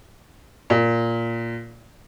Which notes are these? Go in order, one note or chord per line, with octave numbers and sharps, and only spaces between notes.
A#2